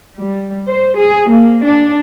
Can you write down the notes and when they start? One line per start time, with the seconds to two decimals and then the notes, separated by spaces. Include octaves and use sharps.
0.17 G3
0.68 C5
0.98 G#4
1.30 A#3
1.64 D4